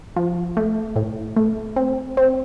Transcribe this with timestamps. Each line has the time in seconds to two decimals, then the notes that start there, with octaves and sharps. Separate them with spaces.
0.16 F3
0.57 A3
0.96 A2
1.36 A3
1.76 C4
2.17 C4